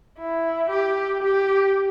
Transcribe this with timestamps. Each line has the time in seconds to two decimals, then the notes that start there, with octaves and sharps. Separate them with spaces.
0.18 E4
0.70 G4
1.23 G4